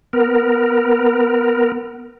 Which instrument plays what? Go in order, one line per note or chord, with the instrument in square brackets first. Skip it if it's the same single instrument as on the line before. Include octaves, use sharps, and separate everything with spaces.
[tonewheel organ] B3 A#4